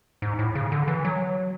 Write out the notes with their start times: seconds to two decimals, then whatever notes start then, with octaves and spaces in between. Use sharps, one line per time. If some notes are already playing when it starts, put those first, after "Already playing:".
0.22 G#2
0.39 A2
0.55 C#3
0.72 D3
0.88 E3
1.05 F#3